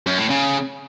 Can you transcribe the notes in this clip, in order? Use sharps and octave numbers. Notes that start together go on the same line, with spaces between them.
F#2
A2
C#3